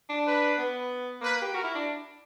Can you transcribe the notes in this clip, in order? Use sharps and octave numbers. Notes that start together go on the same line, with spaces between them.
D4
B4
B3
A#3 B4
G4
F#4 A#4
E4
D4